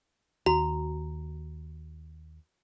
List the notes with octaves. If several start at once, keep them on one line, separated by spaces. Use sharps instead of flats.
D#2 F#4 A#5